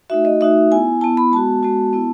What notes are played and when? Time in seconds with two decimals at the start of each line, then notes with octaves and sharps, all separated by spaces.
0.10 A3 D#4 F#4 E5
0.25 D#5
0.41 A3 D#4 F#4 E5
0.71 B3 E4 G#5
1.01 B3 E4 A5
1.17 B5
1.32 G#3 B3 F#4 A5
1.63 G#3 B3 F#4
1.93 B3 E4